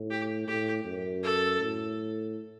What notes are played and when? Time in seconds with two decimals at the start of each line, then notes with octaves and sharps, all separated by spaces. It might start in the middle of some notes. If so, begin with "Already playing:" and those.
Already playing: A2
0.10 G4
0.47 A2 G4
0.85 F#2
1.23 A4
1.60 A2